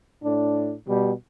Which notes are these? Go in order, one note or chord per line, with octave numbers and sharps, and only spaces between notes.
A2 D4
B2 G3